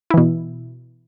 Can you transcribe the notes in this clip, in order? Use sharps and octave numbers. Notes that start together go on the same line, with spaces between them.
B2 E3 E4